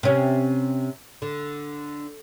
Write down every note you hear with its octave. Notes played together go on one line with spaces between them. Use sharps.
C3 C#4
D3